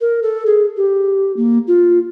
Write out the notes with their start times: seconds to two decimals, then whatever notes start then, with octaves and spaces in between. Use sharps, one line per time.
0.01 A#4
0.23 A4
0.46 G#4
0.77 G4
1.37 A#3
1.68 F4